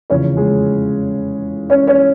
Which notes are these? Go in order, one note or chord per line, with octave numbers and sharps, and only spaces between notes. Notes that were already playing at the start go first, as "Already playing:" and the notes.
F1 E2 C#3 F3 C#4 C#5
G#3 G#4
C#4 C#5
C#4 C#5